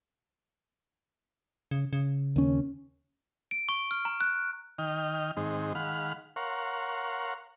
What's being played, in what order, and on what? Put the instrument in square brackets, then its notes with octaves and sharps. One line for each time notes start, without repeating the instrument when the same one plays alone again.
[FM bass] C#3
C#3
[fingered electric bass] D#2 C#4
[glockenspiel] D7
C#6
F6
A#5
F#6
[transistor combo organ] D#3 D#5 G5 F6
G#2 D#3 G#3 C4 D#4
D#3 G#3 F5 F#5 B5 F6
A#4 C#5 F5 F#5 C6 C#6